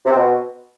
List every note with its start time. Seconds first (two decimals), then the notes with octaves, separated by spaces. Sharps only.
0.06 C3
0.11 C4
0.16 B2